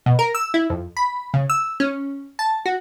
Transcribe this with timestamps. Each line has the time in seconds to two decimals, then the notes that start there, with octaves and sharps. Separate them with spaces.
0.06 B2
0.19 A#4
0.35 E6
0.54 E4
0.70 F2
0.97 B5
1.34 C#3
1.50 E6
1.80 C#4
2.39 A5
2.66 F#4